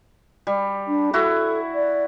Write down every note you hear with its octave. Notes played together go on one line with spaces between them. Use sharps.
G3
D4
E4 F#4 A4
D5